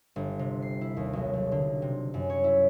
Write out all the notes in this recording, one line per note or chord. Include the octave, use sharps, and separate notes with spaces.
G1
C3
C7
E4
D#2
B1
B1
D3
C3
F#2
C#5
E4